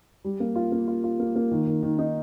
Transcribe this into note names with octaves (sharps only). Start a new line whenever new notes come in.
G3
A#3
F4
A#3
F4
F4
A#3
A#3
D#3
D#3
D#3
D#4